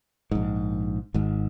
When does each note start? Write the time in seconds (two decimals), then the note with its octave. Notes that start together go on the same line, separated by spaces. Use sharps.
0.31 A#1 G#2
1.14 G#1 G#2